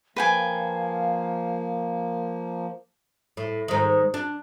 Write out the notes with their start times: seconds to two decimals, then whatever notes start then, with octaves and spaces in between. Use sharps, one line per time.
0.16 F3 A#3 B4 F5 G5 G#5
3.37 A2
3.68 G#2 D#3
4.14 D4